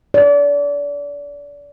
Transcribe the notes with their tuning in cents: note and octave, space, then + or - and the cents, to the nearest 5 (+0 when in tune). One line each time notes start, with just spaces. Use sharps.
D5 -30